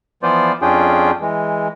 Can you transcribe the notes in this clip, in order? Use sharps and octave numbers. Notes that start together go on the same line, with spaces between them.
E3 F3 B3 F4 C5 D5
F2 C#4 D4 F4 G#4 G5
E3 G#3